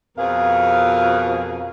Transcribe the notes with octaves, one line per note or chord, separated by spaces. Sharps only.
F2 B2 F3 G#4 A#4 F5